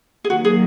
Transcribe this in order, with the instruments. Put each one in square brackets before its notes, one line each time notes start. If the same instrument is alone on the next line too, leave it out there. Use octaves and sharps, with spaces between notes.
[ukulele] G#4
[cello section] D#3 F#3 A#3 [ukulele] F#4
[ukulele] G#4